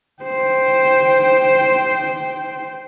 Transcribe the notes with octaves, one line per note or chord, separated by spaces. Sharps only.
C5 G5